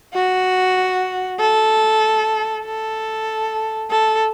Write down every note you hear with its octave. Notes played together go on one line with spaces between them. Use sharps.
F#4
A4
A4
A4